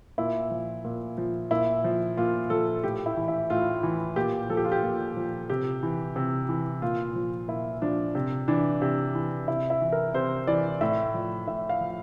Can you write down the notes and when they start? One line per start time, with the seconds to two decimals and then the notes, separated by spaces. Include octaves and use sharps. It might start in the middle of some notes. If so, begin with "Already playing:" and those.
0.18 A#2 E4
0.51 F3
0.85 A#2
1.18 F3
1.51 A#2 E4
1.84 F3
2.17 A#2 F4
2.50 F3 A4
2.84 A2 G4
3.06 E4
3.17 E3
3.28 E4
3.50 A2 F4
3.83 E3
4.16 A#2 G4
4.50 F3 A4
4.57 G4
4.65 F4
4.72 G4
4.83 A#2
5.17 F3
5.50 C3 G4
5.83 E3
6.16 C3
6.49 E3
6.82 A#2 F4
7.15 F3
7.48 A#2 E4
7.82 F3 D4
8.15 C3
8.48 E3 D4
8.82 C3
9.15 E3
9.48 C3 E4
9.70 E4
9.81 E3
9.92 A#4
10.14 C3 C5
10.47 E3 D5
10.81 A2 E5
11.14 F3
11.47 A2 E5
11.69 F5
11.80 F3